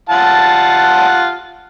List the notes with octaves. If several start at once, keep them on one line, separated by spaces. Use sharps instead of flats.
F4 F#5 A5